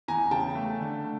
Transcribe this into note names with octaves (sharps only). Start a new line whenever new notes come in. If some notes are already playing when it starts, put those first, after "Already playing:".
E2 G#5 A#5
C#3 G5 A5
A3
D3
A3